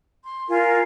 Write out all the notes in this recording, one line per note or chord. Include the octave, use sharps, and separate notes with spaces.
C6
F4 A#4 G#5